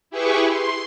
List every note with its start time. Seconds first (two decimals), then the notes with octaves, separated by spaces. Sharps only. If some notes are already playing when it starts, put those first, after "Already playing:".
0.10 E4 G4 G#4 B4 C#6
0.49 C6